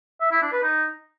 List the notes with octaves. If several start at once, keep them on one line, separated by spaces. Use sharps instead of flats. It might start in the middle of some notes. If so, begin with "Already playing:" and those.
E5
E4
D4
B4
D#4